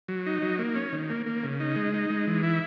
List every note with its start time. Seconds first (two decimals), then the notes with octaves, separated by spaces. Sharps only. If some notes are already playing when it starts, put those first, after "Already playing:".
0.08 F#3
0.26 D#4
0.42 F#3
0.59 A#3
0.75 C#4
0.93 D#3
1.10 A#3
1.26 A#3
1.44 C#3
1.60 D#4
1.76 G#3
1.94 D#4
2.10 G#3
2.27 E3
2.43 E4